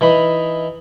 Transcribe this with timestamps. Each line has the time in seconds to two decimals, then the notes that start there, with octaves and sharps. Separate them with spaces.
0.01 E3 D#4 B5 D#6